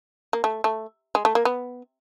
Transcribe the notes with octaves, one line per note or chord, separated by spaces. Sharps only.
A#3
A3
A3
G#3
A3
A#3
B3